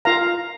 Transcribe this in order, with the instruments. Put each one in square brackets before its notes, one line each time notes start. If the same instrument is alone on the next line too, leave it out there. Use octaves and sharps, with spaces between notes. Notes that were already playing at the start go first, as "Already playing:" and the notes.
[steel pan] F4 A#4 F5 A#5